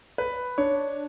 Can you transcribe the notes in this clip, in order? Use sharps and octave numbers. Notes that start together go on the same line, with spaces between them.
B4
D4 C#5